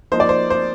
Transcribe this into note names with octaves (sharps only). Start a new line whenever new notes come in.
F3 A#3 D#4 C5
D5
C5
C5